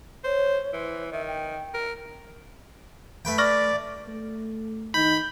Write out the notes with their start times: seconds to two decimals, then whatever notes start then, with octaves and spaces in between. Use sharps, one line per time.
0.24 C5 C#5
0.73 E3 C5
1.12 D#3 E5
1.27 G5
1.74 A#4
3.25 A3 B4 G5
3.38 D5 C#6 F6 A#6
4.08 A3
4.94 D#3 D#4 B5 G6